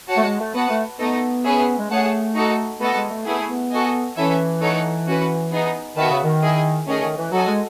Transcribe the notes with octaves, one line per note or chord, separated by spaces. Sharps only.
F#4 C#5 F#5 A5
A3
G#3
A3
B3 F#4 B4 F#5 A5
A3
A3 B3 D#4 A4 D#5
C#4 G#4 B4 E5
G#3
A3 G#4 C#5 F#5 A5
D#4 F#4 A4
A3 B3 F#4 A4 D#5 A5
G#3
A3
A3 B3 E4 G#4
B3
F#4 A4 D#5 G#5
E3 C#4 E4 A4 E5 G#5
A3 D#4 A4 C#5 F#5
C#4 F#4 B4
B3 D#4 G#4
D#3 B3 F#4 B4 E5 A5
C#3
D#3
E4 G#4 D#5
D#3 A3 C#4 G#4 D#5
D#3
E3
F#3 F#4 A4 D#5 G#5
G#3